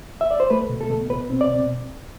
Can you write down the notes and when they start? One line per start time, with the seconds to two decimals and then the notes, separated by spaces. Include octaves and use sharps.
0.21 E5
0.31 D5
0.40 C5
0.50 A3 B4
0.70 B2
0.81 A4
0.90 B2
1.10 B2 B4
1.30 C4
1.41 D5
1.51 B2